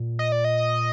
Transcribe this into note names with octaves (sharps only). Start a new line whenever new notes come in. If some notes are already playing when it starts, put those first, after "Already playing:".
Already playing: A#2
D#5
D5
D#5